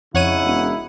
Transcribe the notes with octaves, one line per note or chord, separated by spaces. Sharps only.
F2 C#3 D#4 E4 C#5 F#5 D#7
E1